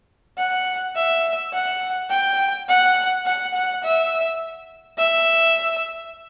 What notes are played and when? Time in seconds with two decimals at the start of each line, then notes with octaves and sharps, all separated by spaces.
0.38 F#5
0.96 E5
1.53 F#5
2.11 G5
2.69 F#5
3.26 F#5
3.55 F#5
3.84 E5
4.98 E5